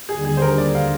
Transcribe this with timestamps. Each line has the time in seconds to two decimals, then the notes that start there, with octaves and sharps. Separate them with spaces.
0.09 D#2 D3 G3 G#4
0.25 G#4
0.37 C5
0.42 A#4
0.58 D5
0.75 F5